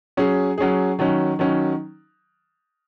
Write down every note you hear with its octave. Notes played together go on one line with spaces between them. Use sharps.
F#3 C#4 G#4
F#3 C#4 G#4
D#3 F#3 C#4
D#3 F#3 C#4